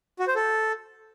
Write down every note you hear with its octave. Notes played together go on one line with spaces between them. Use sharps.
F#4
C5
A4